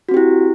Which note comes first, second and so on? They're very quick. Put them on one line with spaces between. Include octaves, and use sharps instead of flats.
F#4 C4 G4 E4